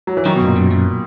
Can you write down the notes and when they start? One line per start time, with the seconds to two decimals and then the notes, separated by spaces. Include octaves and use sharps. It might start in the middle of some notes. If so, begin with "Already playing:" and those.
0.07 F#3
0.17 E3
0.25 D#3 F#3
0.36 B2
0.41 F#2 A#2
0.56 F#2
0.71 F#2